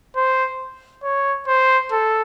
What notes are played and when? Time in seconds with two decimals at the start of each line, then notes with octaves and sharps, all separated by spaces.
0.16 C5
1.04 C#5
1.48 C5
1.92 A4